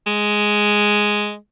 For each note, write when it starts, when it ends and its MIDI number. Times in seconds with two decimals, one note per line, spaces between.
0.07 1.35 56